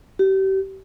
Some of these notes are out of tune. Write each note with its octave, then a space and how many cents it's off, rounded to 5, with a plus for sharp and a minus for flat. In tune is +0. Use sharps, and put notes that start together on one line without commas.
G4 -35